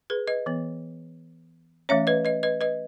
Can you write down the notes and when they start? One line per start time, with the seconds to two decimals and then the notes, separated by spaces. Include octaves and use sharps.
0.10 G#4 B4
0.28 B4 D#5
0.46 E3 B3
1.89 E3 A3 C#4 C#5 E5
2.07 B4 D#5
2.25 B4 D#5
2.43 B4 D#5
2.61 B4 D#5